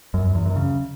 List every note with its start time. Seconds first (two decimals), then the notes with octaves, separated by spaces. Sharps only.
0.14 F#2
0.24 F#2
0.35 E2
0.45 F#2
0.56 C#3